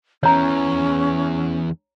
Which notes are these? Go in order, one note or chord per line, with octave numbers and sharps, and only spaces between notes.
E2 E3 C#4 C#5 A#5